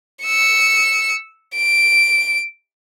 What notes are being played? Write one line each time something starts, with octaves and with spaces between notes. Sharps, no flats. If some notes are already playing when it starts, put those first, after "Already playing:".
E6 C#7
D7